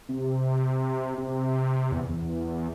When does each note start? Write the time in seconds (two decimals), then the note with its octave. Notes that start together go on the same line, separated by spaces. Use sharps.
0.09 C3
1.18 C3
1.92 E2
2.09 E2